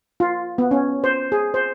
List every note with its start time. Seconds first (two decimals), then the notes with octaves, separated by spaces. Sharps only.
0.20 F4
0.58 B3
0.71 C#4
1.04 C5
1.32 G#4
1.54 C5